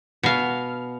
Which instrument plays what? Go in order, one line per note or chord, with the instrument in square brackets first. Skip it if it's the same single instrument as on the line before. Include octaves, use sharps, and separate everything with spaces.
[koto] B2 F5